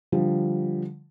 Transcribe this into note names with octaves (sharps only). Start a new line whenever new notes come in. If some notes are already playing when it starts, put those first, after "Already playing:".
D3 F3 G3